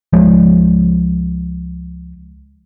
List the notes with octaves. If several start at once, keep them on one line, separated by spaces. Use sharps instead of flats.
C#2 F3 G#3